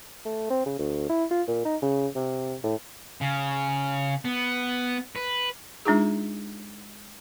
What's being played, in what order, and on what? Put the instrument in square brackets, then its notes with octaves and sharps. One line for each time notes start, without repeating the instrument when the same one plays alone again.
[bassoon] A3
C4
C#3
D2
E4
F4
A#2
D#4
C#3
C3
A2
[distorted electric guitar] C#3
B3
B4
[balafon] G#3 D4 D#4 F4 G#4